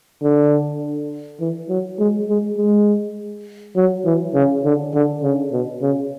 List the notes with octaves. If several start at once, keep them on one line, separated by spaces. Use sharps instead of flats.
D3
E3
F#3
G#3
G#3
G#3
F#3
E3
C#3
D3
D3
C#3
B2
C#3